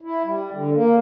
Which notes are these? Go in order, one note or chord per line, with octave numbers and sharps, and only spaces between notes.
E4
G3
D3
A#3